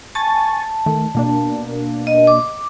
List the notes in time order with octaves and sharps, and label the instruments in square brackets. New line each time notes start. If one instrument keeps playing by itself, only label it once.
[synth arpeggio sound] G#5 C#6 A6 [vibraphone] A5
[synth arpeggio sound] D#3 A3
B2 A#3 D4
[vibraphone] D#5
D6